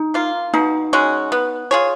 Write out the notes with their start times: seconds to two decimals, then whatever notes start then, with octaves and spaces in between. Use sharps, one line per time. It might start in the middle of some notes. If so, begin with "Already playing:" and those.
Already playing: D#4
0.14 A#3 F4
0.53 B2 D#4
0.93 G#3 C#4 F#4
1.32 B3
1.71 F4 G#4 C#5